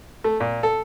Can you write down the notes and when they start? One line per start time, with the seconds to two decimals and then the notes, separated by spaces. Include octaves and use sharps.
0.24 A3
0.40 A#2
0.63 A4